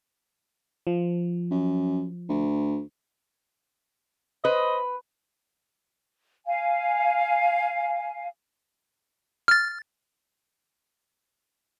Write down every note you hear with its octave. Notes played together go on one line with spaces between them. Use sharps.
F3
F#2
D2
B4 C5 D#5
F5 G#5
F6 A6